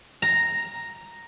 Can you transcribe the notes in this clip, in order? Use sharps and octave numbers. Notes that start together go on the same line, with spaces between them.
A#5